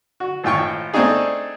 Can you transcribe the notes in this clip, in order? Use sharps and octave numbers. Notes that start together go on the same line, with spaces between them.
F#4
G#1 A2 F4 G5 C#6
A3 C4 D4 D#4 G#4